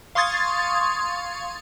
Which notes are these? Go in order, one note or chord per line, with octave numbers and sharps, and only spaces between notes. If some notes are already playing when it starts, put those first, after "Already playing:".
F5 C6 C#6 D#6 G#6 A6